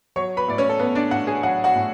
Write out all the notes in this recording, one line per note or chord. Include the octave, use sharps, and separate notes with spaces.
F#3 C#5 C#6
B4 B5
A2 D5
C#4 C#5
A4
B3 B4
D4 D5
A2 F#4 F#5
G#4 G#5
F#3 F#4 F#5
F#4 F#5
A2